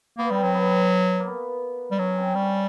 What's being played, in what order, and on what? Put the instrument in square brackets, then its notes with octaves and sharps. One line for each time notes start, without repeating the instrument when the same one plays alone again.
[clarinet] A#3 [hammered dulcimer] B3
[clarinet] G3 [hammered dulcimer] C4
[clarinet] F#3 [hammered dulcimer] C4
[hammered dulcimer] B3
A#3
B3
[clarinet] G3
[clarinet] F#3 [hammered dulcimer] C#4
[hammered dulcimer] C4
[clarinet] G3 [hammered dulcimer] C#4